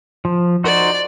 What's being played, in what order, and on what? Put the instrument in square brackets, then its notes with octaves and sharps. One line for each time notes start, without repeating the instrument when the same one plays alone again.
[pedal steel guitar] F3
[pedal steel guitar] D#4 F#4 C5 [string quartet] D5